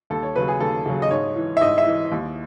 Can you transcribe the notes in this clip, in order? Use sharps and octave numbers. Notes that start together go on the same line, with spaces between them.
D#2 A4
C#5
C#3 F#3 B4
G#4
D#2 A4
C#3 F#3
D#5
G#2 C#5
E3
E5
G#2 D#5
E5
E3
D#2